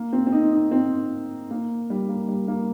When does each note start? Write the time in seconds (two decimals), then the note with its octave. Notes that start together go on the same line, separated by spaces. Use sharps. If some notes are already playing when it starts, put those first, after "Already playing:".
Already playing: A#3
0.13 C4
0.27 C4
0.33 D#4
0.53 D#4
0.71 C4
1.51 A#3
1.90 G3
2.09 A#3
2.28 G3
2.48 A#3